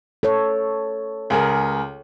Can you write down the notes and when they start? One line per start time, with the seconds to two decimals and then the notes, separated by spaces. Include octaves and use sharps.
0.23 A4 C#5
1.30 C#2 G#4 A#4